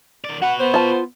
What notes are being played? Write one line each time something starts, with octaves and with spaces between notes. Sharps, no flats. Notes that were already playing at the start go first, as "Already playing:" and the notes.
D#3 D5
F#4 B4 F#5
B3 C5
F4 A5